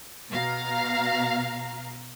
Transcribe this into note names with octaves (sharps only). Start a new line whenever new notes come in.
B2 F5 A#5